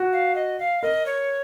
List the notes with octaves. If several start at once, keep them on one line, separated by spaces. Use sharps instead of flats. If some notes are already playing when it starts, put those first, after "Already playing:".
Already playing: F#4
F5
D#5
F5
A#4 D#5
C#5